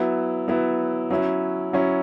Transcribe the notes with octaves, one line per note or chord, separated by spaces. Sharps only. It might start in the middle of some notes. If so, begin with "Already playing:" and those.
Already playing: F#3 B3 E4
F#3 B3 E4
F#3 C#4 E4
F#3 C#4 E4